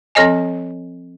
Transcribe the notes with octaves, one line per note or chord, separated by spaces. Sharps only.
F3 C4 A4 C#5 D#5 G#5